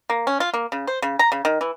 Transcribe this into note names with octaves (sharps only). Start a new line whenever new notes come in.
A#3
C#4
F4
A#3
C#3
C5
C#3
A#5
C#3
D#3
E3